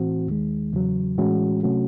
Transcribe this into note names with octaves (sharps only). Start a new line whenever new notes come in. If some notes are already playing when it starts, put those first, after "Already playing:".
Already playing: A2 E3 C4 F#4
D#2 D#3 G#3
E2 C#3 F#3
A2 E3 G#3 C#4 F#4
C3 F#3 A3 C#4 F#4